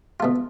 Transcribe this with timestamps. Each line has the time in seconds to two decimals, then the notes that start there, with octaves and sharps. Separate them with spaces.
0.20 B2 A3 F4